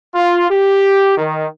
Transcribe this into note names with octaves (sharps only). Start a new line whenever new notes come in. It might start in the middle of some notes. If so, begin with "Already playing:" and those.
F4
G4
D#3